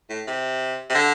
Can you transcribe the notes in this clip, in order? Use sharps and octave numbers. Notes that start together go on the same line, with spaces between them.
A2
C3
C3
D3